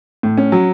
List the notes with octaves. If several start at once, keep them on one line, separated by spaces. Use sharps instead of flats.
A2
C#4
F#3